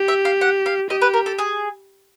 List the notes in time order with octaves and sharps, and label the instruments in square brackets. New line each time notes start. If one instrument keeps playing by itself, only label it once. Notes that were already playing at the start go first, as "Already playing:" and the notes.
Already playing: [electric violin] G4
[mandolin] E5
F5
F#5
F5
[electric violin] G4 [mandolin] D#5
[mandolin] B4
A#4
A4
G#4